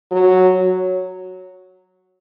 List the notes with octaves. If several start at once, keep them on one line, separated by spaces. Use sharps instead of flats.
F#3